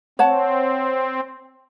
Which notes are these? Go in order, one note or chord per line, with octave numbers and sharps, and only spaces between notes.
C4 C#5 F#5 A5